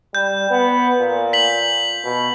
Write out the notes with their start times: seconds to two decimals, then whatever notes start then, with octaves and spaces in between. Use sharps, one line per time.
0.15 G3 G6
0.50 B3
0.99 A#2
1.33 B6 F#7
2.05 B2